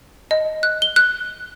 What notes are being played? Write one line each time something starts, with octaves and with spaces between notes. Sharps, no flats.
D#5
F#6
G7
F#6